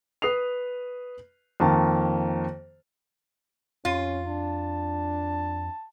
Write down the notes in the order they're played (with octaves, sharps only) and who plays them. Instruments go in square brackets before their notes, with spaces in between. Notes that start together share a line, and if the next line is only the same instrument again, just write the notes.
[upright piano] B4 D#6 C7 F7
F2 D#3 A#3 A5
[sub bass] F2 [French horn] C#4 [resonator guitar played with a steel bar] F4
[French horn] D4 [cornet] A5